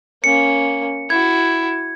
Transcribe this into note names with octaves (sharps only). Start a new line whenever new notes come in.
A#3 C#4 C#7
E4 F#4 G#6